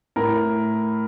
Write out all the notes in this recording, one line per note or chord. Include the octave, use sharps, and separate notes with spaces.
A2 A#4